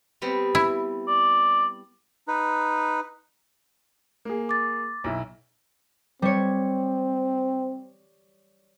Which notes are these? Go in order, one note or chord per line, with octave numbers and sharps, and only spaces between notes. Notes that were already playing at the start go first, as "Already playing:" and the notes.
G3 B3 C4
E4
D5
D#4 B4
A#3 G#4
D6 A6
B1 E4
G3 C4 C#5